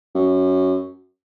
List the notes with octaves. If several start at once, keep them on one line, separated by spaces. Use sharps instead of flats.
F#2